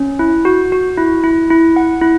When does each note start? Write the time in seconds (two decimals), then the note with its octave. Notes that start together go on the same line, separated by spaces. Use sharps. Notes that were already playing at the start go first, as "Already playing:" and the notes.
Already playing: C#4
0.19 E4
0.45 F#4
0.72 F#4
0.97 E4
1.23 E4
1.50 E4
1.76 F#5
2.02 E4